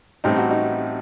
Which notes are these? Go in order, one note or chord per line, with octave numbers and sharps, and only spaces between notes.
A1 A2 G3 C4 D#4
F#4
D#4